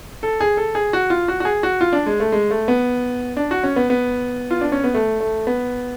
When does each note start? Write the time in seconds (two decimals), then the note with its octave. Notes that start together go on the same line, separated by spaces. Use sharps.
0.23 A4
0.40 G#4
0.57 A4
0.75 G#4
0.93 F#4
1.10 F4
1.28 F#4
1.40 F#4
1.45 G#4
1.63 F#4
1.81 F4
1.93 D4
2.06 G#3
2.20 A3
2.32 G#3
2.51 A3
2.68 B3
3.37 D4
3.51 F#4
3.64 C#4
3.76 B3
3.90 B3
4.51 F4
4.61 D4
4.72 C#4
4.84 B3
4.94 A3
5.20 A3
5.47 B3